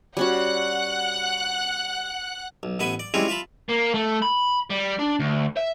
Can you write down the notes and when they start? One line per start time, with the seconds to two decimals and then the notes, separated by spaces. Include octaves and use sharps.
0.17 G3 C#4 F#4 F#5 F#6
2.63 B1
2.79 A1 B3 B4 E5 G#5
2.99 D5
3.14 G3 G#3 C4 C#4 E4 F4
3.28 F4 E5 A5 B5
3.69 A#3
3.94 A3
4.22 B5
4.70 G3
4.99 D4
5.19 D2
5.57 E5